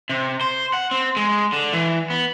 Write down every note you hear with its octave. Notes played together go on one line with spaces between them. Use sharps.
C3
C5
F#5
C4
G#3
D3
E3
B3